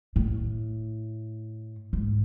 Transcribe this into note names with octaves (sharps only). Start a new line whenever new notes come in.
A2
G#2